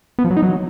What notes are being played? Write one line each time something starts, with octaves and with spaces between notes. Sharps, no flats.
B3
F3
F#3
D#4
F#3